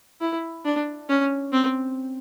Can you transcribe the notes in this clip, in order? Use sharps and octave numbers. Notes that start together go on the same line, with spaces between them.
E4
D4
C#4
C4